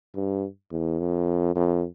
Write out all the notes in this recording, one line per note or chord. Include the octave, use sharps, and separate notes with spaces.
G2
E2
F2
F2